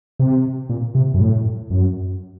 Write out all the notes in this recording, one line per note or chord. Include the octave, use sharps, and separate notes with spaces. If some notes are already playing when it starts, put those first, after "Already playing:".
C3
A#2
C3
F#2
A2
F#2